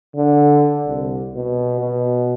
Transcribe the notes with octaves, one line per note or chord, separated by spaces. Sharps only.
D3
C2
B2
B2